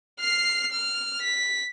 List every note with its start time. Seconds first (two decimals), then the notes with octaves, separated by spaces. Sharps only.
0.20 F6 C7
0.72 F6
1.21 B6